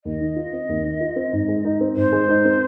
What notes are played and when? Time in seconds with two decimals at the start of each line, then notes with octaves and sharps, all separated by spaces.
0.04 D#2 D#5
0.21 D#3
0.36 F4
0.53 C4
0.69 D#2
0.84 D#3
1.01 F4
1.16 C4
1.33 G#2
1.48 G#3
1.65 D#4
1.81 C4
1.96 G#2 C5
2.12 G#3
2.29 D#4
2.45 C4